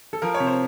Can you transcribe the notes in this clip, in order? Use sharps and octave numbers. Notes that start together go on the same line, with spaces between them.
A4
F3 A#4
C#5
C3
C5